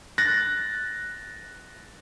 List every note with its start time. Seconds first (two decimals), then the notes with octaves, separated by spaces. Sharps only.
0.18 F#6 A6 A#6